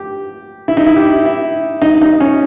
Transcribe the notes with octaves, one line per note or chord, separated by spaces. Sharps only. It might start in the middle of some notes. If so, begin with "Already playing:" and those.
Already playing: G4
E4
D#4
E4
G4
E4
D#4
D#4
C#4